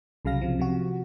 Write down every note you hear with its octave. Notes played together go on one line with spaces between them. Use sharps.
C2 C#3 F#3 F5 A#6
C3 F3
C3 F3 F#4